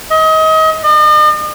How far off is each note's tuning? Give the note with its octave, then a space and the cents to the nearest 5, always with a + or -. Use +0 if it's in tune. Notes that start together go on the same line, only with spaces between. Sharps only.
D#5 +30
D#5 -45